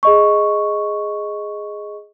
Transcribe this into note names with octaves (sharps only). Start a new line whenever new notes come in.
G#4 D#5 C#6